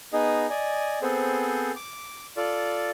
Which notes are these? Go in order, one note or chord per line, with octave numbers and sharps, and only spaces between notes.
B3 D#4 G#4 D#5
D5 D#5 G#5
B3 C4 G#4 A4 C5
D6
F4 A4 D5